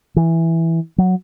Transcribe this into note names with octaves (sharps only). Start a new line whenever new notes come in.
E3
F#3